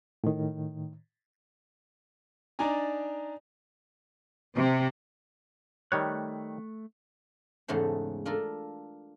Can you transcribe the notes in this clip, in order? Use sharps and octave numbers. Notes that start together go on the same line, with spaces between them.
A2 D#3
D4 D#4 D5 G#5 A#5
C3
D#3 G3 A3 C#5 F#6
E2 G#2 C#3 A3 C5
D4 F4 A4 A#4